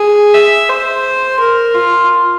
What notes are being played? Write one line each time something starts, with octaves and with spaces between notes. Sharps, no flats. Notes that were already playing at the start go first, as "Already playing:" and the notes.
Already playing: G#4
E5
C5
A#4
F4